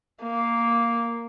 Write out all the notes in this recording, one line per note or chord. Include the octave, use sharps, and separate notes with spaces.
A#3